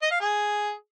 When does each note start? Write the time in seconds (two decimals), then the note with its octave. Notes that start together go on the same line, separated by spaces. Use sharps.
0.02 D#5
0.11 F5
0.20 G#4